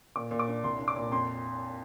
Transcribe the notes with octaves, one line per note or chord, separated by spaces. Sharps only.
A#2 D6
A#2
D6
D4
C2 C6
D4
D6
A#2
F2 C6